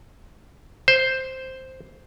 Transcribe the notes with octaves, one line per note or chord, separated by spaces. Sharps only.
C5